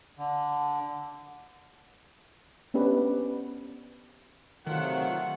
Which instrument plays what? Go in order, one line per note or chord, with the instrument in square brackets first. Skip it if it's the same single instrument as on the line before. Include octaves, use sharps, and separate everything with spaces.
[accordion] D3
[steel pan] B3 C#4 D4 G4 B4 C5
[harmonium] C3 F4 [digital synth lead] D#3 [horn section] F#3 A3 F#5